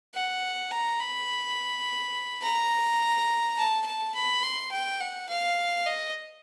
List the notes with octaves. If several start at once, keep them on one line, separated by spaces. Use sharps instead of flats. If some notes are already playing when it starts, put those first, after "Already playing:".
F#5
A#5
B5
A#5
A5
A5
B5
C6
G5
F#5
F5
D#5